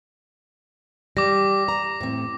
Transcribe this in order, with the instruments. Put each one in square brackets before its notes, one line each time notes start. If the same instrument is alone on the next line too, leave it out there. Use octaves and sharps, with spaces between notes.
[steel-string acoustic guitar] G3 [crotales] D6 A#6
[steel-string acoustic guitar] A#5
A2 C4